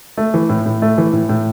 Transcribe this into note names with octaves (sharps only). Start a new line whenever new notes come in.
A3
E3
A2
A2
A3
E3
A2
A2